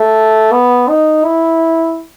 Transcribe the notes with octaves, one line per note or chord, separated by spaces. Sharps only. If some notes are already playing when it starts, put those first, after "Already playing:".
Already playing: A3
B3
D#4
E4